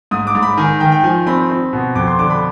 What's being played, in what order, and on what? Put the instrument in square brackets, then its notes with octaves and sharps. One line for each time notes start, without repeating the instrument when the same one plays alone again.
[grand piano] G#2 D#6
D6
G#2
B5
D#3 G#5
D#3 G5
G5
F3 G#5
C4 B5
C4
B2
F2 D6
C6
D3 D6
B5